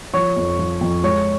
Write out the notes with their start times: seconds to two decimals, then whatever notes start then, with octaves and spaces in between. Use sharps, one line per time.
0.14 F3 C#5 C#6
0.37 F2
0.59 F3
0.81 F2
1.04 G#3 C#5 C#6